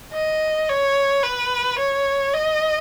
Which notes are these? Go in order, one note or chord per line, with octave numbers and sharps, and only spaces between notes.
D#5
C#5
B4
C#5
D#5